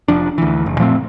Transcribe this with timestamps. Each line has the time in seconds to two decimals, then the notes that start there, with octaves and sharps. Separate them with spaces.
0.08 F1 F3 D4
0.38 D2 E3
0.66 F#1
0.78 A#2 F3 A3 C4